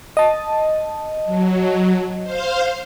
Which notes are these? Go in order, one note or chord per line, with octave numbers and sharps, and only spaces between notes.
D#5 A5
F#3
C5 F5